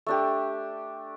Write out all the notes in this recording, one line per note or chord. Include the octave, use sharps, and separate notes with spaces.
A3 D4 G4